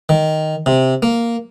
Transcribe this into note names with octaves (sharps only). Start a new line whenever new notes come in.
D#3
C3
A#3